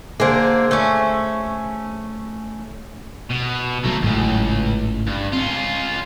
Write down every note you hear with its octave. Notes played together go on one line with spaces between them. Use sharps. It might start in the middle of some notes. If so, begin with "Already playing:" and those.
D3 A#3 G#4 C5
A3 C#4
B2
D#3 E3 F#3 A3 A#3
G#1 C#2 A2 C#3
G2
C4 C#4 F4